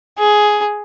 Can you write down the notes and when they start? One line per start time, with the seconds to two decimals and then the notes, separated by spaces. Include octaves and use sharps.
0.18 G#4